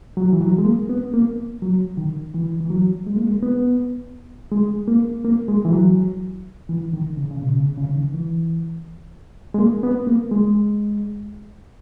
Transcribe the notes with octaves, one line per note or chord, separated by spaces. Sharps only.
F#3
E3
F#3
G#3
A#3
B3
A#3
F#3
D#3
E3
E3
F#3
G#3
A#3
G#3
B3
G#3
A#3
A#3
G#3
E3
F#3
E3
D#3
C#3
C#3
B2
C#3
C#3
D#3
E3
G#3
A#3
B3
A#3
G#3